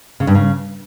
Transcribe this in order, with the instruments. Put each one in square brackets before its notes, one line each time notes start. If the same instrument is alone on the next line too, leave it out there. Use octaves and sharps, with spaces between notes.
[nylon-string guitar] C#3
G2
C#3